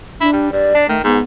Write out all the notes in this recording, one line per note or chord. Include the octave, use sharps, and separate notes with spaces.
D4 E4
G3
G2 D5
D4
D#3 A3
G#2 B3